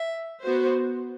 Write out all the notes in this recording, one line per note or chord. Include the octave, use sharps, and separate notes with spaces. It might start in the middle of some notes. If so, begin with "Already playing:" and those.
Already playing: E5
B3 F#4 C5